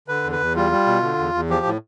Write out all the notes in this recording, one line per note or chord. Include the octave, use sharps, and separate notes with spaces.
D3 B4
E2
B4
E2
G3 F4
G3
B2
D3
E2
E2
F3 G4
A2